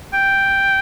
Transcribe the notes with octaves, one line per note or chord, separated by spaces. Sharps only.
G5